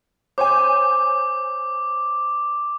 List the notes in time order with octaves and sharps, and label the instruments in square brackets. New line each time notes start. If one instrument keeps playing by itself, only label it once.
[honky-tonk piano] C5 C#5 G#5 [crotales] D6